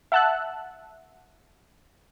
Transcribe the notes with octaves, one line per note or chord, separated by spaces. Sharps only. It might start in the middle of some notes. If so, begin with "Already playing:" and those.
E5 F#5 A5 E6 F#6